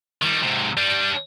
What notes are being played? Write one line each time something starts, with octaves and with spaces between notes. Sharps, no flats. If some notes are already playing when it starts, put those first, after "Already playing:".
D#3 G3
G#2 C3
G3 D4